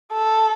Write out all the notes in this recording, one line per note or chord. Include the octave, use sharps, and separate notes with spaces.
A4